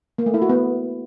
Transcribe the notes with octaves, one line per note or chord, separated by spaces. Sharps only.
A#3
A3
E4
F#4
B3